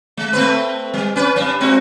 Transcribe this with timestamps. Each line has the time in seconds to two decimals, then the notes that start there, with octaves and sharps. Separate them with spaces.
0.17 G#3
0.33 A3 C4 B4
0.94 G3
1.16 C#4 B4
1.36 G2 D4
1.60 G#3 C4 F#4